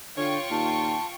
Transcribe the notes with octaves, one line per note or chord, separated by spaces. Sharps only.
D3 F4 C#5 G5 C#6
D#2 A#2 A5